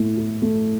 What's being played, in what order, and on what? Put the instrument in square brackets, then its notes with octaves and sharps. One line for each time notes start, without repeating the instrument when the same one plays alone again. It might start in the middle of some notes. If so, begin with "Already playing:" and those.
Already playing: [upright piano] A2 E4
E4
A3